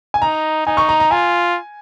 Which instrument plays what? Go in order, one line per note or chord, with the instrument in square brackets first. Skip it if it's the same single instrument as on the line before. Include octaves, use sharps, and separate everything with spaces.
[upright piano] G#5
[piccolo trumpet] D#4 [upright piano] A#5
[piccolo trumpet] D#4 [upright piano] G#5
[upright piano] C#6
A#5
A#5
[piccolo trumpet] F4 [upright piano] G#5